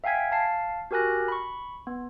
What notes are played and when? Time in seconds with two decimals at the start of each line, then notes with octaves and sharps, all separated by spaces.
0.04 E5 F5 G5 G#5 G#6 B6
0.31 F5 A5 C7
0.91 F#4 G4 A#4 G#5 F#6 A#6
1.28 B5 C#6
1.87 B3